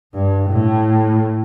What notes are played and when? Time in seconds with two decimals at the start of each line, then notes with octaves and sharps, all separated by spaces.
0.13 G2
0.49 A2